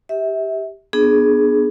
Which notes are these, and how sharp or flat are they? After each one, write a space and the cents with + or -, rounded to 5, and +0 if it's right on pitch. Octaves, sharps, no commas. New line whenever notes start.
G4 +0 E5 -25
B3 +0 D4 +30 G#4 +10